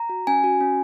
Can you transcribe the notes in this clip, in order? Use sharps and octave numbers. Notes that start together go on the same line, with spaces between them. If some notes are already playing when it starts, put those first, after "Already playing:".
Already playing: A#5
F#4
C#4 G#5
F#4
C#4